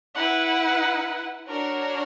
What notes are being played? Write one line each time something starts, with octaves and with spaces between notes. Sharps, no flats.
E4 B4 F#5
D4 F#4 A#4 C#5